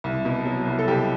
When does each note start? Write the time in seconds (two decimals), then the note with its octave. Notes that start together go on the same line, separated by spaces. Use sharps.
0.04 C2
0.25 B2
0.46 F#3
0.67 C2
0.79 A4
0.88 C2 G4